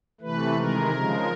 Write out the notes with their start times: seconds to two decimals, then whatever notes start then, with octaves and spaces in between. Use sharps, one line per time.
0.21 C3 E3 A3 B4
0.56 C3 D#3 G#3 A#4
0.92 C#3 F3 G#3